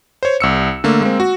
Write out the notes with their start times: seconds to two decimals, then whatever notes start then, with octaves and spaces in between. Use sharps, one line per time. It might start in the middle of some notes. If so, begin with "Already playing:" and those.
0.23 C5 C#5
0.40 C2 E6 C#7
0.84 D3 A3 A#3
1.01 G#3 A#3 C4
1.20 F#4